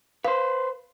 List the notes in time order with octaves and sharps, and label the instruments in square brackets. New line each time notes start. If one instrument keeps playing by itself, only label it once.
[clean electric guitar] B4 C5 [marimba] F5